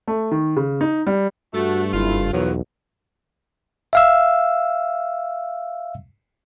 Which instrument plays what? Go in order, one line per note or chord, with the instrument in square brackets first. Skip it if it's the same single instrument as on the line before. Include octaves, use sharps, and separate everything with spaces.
[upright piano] A3
D#3
C#3
D#4
G3
[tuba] G2 [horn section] A3 [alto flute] F#4
[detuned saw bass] F#1 [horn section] A3 F4 [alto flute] E4
[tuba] B1 [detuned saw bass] E2 [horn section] D#3 F3 F#3 [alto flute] B4
[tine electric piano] E5 F5 E6